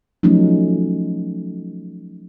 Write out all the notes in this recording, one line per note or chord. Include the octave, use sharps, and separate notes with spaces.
F3 F#3 A3 C#4 D#4